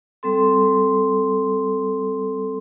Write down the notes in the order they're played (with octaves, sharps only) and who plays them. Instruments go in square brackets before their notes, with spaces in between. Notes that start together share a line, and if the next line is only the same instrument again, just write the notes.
[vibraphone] G3 C4 A4 C6